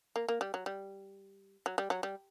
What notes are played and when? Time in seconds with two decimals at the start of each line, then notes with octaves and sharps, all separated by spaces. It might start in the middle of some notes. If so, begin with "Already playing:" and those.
0.16 A#3
0.28 A#3
0.41 G3
0.54 F#3
0.66 G3
1.66 F#3
1.78 G3
1.90 F#3
2.03 G3